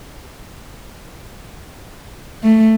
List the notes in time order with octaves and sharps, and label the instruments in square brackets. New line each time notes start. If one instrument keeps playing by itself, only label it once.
[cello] A3